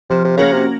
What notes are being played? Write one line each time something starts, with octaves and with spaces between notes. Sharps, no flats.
C3 F3
C3
C#3 A#3 C#4 F#4 A#4
C3